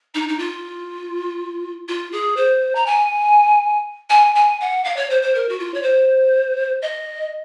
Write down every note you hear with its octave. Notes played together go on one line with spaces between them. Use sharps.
D#4
D#4
F4
F4
G#4
C5
A#5
G#5
G#5
G#5
F#5
F5
C#5
C5
C5
A#4
F#4
F4
C#5
C5
D#5